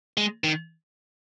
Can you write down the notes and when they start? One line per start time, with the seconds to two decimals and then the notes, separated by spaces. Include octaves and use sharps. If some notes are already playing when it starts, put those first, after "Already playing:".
0.17 G#3
0.44 D#3